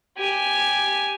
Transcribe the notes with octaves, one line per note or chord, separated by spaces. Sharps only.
G4 G#5